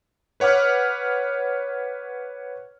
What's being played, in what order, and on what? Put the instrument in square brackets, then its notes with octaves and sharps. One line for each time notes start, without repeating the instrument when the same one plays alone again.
[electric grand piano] B4 C#5 F#5 D6 F6